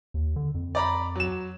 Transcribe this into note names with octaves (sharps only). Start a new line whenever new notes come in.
D#2
D3
F2
D5 A#5 B5
F#3 E7